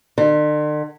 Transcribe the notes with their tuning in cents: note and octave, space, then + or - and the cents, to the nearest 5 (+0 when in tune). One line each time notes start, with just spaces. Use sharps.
D3 +45